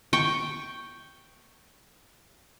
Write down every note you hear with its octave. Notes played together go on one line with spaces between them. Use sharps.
G5 C#6